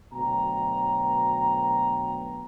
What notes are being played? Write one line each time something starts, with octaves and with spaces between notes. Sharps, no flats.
D2 B2 F#3 G5 A#5